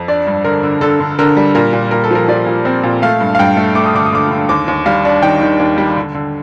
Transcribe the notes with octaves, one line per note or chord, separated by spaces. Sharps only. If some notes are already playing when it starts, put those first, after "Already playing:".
Already playing: F2
D4 D5
G2
D3 A#4
D3
D3 A4
D3
D3 A#4
G3
A#2 A#4
A#2
A#2 A#4
A4
F3 A#4
F3 D5
A#2
C4
A#2
A3 F5
G2
F5
G2 G5
A3
A3 D6
D#6
D3 D6
D#6
D3 D6
D3
D#2 D6
D#2
G3 F5
D4
D#3 G5
D#3
D#2
G3
D3
D3